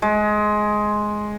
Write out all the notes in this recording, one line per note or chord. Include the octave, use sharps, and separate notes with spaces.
G#3